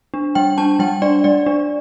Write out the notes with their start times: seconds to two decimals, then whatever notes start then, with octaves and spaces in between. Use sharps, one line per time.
0.14 D4
0.35 G3 G5
0.58 D4 A5
0.79 G3 G5
1.02 D4 D5
1.24 G3 D5
1.46 D4